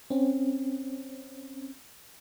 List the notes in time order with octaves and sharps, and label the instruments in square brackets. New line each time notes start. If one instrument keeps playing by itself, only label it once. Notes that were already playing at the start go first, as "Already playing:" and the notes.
[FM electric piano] C4 C#4